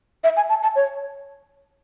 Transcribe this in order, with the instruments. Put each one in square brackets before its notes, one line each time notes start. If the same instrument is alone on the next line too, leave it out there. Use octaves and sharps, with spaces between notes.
[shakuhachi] E5
G#5
A5
A5
C#5